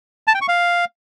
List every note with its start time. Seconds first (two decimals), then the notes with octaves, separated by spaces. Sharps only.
0.28 A5
0.34 G5
0.41 C#6
0.48 F5